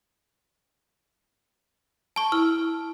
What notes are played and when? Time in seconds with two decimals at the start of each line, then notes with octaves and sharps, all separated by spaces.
2.16 A5 C#6
2.32 E4 F6